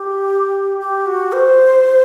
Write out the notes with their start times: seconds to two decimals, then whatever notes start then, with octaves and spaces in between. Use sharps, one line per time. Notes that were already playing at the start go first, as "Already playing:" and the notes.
Already playing: G4
0.80 G4
1.06 F#4
1.32 C5